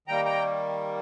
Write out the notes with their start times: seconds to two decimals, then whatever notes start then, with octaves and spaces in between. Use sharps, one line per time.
0.08 D#3 G3 A#3 G5 A#5
0.25 G5 A#5